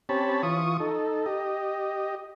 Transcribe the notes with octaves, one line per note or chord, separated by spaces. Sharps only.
C4 C#4 G4 C#5 A5 B5
E3 F4 C#6 D#6
D#4 A4
G4 D#5